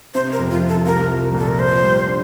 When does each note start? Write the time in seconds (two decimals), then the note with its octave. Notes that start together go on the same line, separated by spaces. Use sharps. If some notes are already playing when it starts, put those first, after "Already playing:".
0.14 C3 C5
0.32 A#4
0.39 F2
0.51 F4
0.62 C3
0.69 A4
0.86 C2 A#4
1.10 F3
1.34 A#2 A4
1.48 A#4
1.58 A#2 C5
1.84 G3
2.07 D4